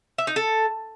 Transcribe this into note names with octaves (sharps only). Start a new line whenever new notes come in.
E5
D#4
A4